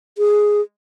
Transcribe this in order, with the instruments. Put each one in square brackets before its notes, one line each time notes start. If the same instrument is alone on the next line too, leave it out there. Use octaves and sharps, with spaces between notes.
[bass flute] G#4